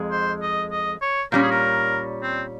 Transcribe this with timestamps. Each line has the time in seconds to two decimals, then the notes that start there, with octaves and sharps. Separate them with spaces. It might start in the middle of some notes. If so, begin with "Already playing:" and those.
Already playing: F2 G#3
0.11 C5
0.42 D#5
0.72 D#5
1.02 C#5
1.32 A#2 G3 C#4 A#4
1.42 G#4
1.51 A#4
2.22 C4